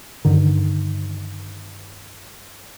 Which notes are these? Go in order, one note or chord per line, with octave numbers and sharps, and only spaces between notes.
G2 D3 D#3